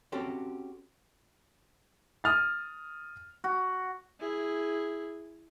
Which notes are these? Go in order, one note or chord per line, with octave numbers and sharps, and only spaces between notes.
C4 C#4 F#4 G4 A4 C5
D#6 F6 A6
F#4
E4 G#4